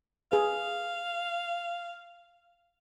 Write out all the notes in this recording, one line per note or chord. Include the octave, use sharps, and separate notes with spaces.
G#4 B4 F5